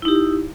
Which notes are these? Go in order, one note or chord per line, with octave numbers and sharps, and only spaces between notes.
D#4 E4 G4